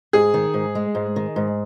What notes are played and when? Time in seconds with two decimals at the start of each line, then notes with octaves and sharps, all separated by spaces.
0.13 G#2 G#4
0.34 D#3
0.54 G#2
0.75 G#3
0.95 G#2
1.16 D#3
1.36 G#2